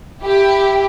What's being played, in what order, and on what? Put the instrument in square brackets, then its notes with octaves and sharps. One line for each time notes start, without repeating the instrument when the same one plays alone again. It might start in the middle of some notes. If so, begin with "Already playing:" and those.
[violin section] E4 G4